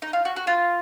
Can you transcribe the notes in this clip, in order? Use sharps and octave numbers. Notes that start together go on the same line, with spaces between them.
D#4
F4
F#4
F#4
F4